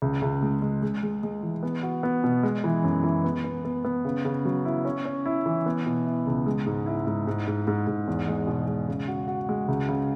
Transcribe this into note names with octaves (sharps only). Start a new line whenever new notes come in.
C#2
C#2
G#3
G#3
G#3
G#3
G#3
E3
B3
F#4
B3
B2
G#3
E3
F#2
E3
B3
B3
B3
B3
C#3
C#3
F#3
E4
C#4
C#4
E4
E3
B3
B2
E4
C#2
G#3
G#2
E4
G#2
G#2
G#2
G#2
G#2
E2
G#3
B2
G#3
C#3
F#4
F#4
G#3
C#2
C#3